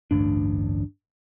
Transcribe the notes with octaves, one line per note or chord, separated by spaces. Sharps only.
A1 D2 G2 D4